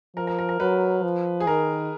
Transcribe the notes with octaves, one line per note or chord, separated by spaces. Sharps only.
F3 A#4
A#4
A#4
A#4
F#3 B4
F3
G#4
D#3 A#4